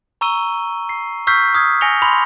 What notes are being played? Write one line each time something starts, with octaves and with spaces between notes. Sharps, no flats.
A#5 C#6 E6 D#7 G7
C7
C#6 E6 F6 G6 B6 C7
D#6 F6 G#6
G#5 A#6 C#7 F7 G7
B5 C6 F7